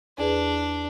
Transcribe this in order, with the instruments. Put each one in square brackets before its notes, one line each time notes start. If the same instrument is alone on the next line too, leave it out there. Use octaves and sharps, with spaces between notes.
[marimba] E2 G#4 B4 [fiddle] D4